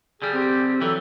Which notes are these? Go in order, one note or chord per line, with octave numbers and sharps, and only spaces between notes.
D3 G3 G#4
C4 G4
E3 F#3 A4